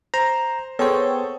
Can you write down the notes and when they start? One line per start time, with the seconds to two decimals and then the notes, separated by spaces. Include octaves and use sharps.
0.14 C5 A#5
0.79 B3 G#4 A4 C5 C#5 G5 C#6